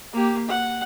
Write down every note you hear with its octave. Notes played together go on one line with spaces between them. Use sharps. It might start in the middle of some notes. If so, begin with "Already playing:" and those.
A#3 G4
F#5